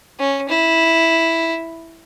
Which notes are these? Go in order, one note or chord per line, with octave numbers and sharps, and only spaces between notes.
C#4
E4